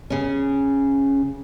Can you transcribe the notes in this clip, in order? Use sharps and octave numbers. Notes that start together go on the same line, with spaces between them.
C#3 C#4